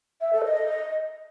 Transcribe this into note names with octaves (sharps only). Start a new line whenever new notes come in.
E5
A4
D#5